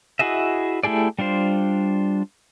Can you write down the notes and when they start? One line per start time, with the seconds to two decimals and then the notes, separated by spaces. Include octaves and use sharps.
0.19 E4 F#4 G#4 D#5 E5
0.83 A3 E4 G4 G#4 D5
1.19 G3 D4 F4 C5